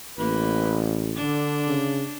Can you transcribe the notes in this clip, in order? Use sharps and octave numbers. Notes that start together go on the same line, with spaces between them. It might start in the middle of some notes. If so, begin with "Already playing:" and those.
A1 A#3 B4
D3 D4
C#3